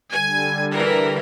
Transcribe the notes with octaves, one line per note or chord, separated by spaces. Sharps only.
D3 G3 G#5
E3 A#4